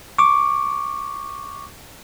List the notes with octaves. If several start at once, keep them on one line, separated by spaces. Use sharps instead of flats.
C#6 D6